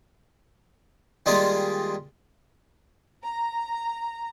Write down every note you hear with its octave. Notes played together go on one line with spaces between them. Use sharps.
D#3 G3 G#3 A#3 F4 A#4
A#5